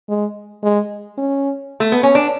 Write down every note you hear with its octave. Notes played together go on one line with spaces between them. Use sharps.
G#3
G#3
C#4
A3
B3
C#4
D4